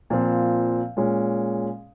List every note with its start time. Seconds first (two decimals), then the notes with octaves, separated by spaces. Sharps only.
0.10 A#2 F3 C4
0.97 A#2 G#3 C#4